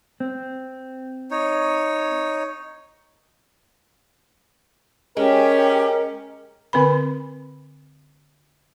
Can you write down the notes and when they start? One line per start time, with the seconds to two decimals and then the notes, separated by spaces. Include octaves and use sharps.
0.20 C4
1.31 D#4 C#5
5.17 G#3 C#4 G4 A#4
6.73 D3 C4 B4 B5